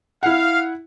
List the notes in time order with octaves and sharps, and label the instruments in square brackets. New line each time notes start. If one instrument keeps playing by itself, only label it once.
[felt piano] E4 F#5 [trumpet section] F5